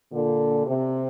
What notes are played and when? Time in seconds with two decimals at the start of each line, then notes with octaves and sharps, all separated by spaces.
0.12 A#2 D3
0.67 C3